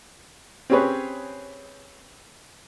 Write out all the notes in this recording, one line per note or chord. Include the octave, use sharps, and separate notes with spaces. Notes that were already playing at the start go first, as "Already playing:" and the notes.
C4 C#4 G4 G#4 B4 C#5